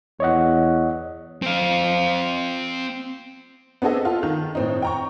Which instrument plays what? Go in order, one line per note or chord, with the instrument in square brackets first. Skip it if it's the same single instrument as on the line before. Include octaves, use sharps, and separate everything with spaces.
[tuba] E2 [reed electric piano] C#5 D#5 F#5
[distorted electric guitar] C4 F5
[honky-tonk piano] B3 C4 D4 G#4 A4 D#5
F4 A4
D#3
A2 C4 D#4
G5 A#5 C#6